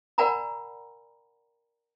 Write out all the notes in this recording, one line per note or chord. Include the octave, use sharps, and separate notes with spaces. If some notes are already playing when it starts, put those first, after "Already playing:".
A#4 D5 F#5 G#5 A#5 B5